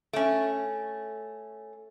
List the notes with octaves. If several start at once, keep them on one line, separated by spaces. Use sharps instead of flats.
A3 C#4